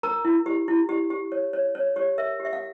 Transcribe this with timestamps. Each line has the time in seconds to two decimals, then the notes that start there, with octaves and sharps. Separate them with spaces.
0.03 A#4 A#5
0.25 E4
0.46 G4
0.68 E4
0.89 G4
1.10 G4
1.32 C#5
1.53 C#5
1.75 C#5
1.96 G4 C#5
2.18 A#4 E5
2.40 G4
2.45 E5
2.53 F5